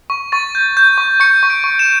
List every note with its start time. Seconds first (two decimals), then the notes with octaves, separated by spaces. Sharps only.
0.10 C#6
0.32 C#6 A6
0.55 G6
0.77 G6
0.98 C#6
1.20 C#6 C#7
1.43 C#6
1.50 D7
1.64 C#6
1.79 E7